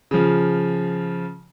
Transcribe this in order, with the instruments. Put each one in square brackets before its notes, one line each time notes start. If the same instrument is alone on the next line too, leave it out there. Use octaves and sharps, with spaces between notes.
[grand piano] C#3 F3